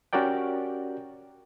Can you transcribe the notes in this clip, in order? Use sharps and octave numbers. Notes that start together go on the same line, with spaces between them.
C#4 F#4 G4 A#4 D5 G5